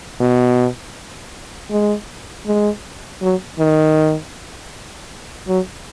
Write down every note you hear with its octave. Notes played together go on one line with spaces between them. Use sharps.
B2
G#3
G#3
F#3
D#3
F#3